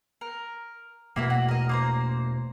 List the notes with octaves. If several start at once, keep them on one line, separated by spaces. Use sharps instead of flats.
A#4
E1 B2 A3 A#3 E4 F#5
F#4
A#4 D#5
A#3 C5 A#5